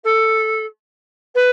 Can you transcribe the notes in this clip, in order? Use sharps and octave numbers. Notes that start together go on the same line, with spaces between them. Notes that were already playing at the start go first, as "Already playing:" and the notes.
A4
B4